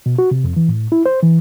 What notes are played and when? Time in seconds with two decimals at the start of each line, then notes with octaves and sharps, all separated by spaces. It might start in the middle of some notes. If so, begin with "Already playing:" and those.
0.06 B2
0.19 F#4
0.31 C3
0.44 F2
0.57 E3
0.69 A2
0.92 E4
1.06 C5
1.22 E3